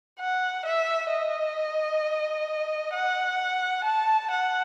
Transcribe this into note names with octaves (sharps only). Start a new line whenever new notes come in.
F#5
E5
D#5
F#5
A5
F#5